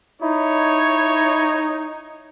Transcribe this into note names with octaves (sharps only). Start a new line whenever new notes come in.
D#4 E4 C#5